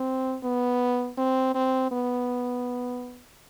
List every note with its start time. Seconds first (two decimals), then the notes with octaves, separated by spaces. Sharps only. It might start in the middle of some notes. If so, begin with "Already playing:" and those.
Already playing: C4
0.43 B3
1.18 C4
1.54 C4
1.92 B3